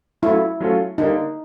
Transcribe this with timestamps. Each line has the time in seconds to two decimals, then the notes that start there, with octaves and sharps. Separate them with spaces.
0.22 F#3 A3 C#4 E4 F4 A4
0.60 F#3 A3 C#4 F4 A4
0.98 D3 G3 A#3 D4 D#4